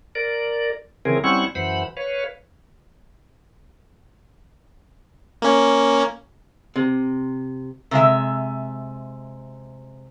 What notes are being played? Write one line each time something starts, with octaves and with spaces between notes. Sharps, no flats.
A#4 D5
C#3 E3 C4 G#4 A#4
G3 C4 C#4 E4 F#5 C#6
F#2 E3 C5 F#5 B5
B4 C#5 F5
A#3 C#4
C3
C3 G#3 E5